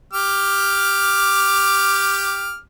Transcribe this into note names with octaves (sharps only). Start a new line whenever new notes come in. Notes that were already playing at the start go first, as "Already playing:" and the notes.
G4 D6 F6